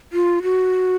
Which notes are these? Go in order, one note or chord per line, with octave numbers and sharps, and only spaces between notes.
F4
F#4